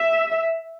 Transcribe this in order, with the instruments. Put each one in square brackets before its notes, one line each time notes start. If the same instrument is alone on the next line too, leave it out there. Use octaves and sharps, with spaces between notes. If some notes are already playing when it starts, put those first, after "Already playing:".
Already playing: [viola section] E5